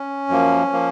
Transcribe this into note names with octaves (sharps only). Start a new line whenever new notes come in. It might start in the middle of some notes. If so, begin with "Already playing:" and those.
Already playing: C#4
F#2 F3 A#3
F3 A#3